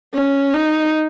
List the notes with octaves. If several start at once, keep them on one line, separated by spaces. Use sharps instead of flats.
C#4
D#4